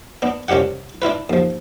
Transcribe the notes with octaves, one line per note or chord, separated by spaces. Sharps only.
B3 D4
C2 C#4 D4 G4 F#5
D4 E4 F4 B4
D#2 F3